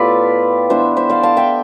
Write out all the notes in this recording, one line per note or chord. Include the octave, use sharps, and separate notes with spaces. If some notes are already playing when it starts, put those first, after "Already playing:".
Already playing: A2 B3 F4 G4 A4 B4 D5
E3 B3 D4 C5 E5
C5 E5
D5 F5
F5 A5
E5 G5